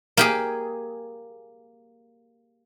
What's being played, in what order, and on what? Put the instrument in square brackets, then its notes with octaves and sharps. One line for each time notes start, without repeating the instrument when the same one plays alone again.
[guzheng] A#3 G4 G#4